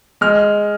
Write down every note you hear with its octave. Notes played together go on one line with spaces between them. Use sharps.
G#3 F6